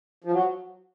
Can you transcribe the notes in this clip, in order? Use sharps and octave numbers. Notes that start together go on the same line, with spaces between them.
F3
F#3